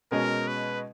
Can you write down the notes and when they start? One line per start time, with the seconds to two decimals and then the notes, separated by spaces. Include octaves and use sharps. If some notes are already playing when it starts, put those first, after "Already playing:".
0.11 B2 G#3 C#4 A#4
0.48 B4